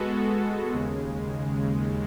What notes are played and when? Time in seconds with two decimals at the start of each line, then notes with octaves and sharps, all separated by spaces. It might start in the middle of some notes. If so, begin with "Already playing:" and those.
Already playing: G#3 B3 F#4 A4
0.73 D#2 C#3 G#3